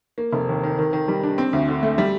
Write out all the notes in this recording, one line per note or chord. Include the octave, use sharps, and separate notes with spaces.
A#3
F1
D#2
D#3
D#3
D#3
G3
D4
C4
D2
D3
A3
G3